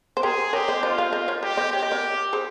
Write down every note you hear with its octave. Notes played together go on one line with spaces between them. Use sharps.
C5
G4 G#4 A#4
G4 A#4 C#5
C5 D#5
F4 C5 D#5
C#5 F5
C5 D#5
A#4 C#5
G4 C5 D#5
C5 D#5
G4 C#5
D#5
A#4 C#5
G#4 C5